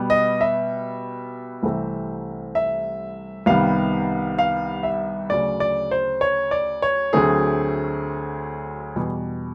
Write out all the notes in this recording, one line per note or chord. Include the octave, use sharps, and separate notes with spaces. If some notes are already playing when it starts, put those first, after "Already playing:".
Already playing: B2 G3 B3
D#5
E5
C2 C3 E3 A3 C4
E5
C2 C3 D#3 G3 B3 F5
F5
E5
D2 C#3 F#3 D5
D5
C5
C#5
D5
C#5
D2 D3 F#3 A3 C4 G#4
E2 B2 G3